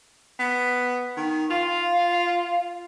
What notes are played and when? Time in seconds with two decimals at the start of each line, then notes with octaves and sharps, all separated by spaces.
0.39 B3
1.17 D#3
1.50 F4 F5